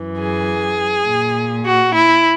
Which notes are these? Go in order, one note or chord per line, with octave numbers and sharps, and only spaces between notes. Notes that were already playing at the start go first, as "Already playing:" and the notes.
Already playing: F#2 E3
G#4
A#2
F#4
E4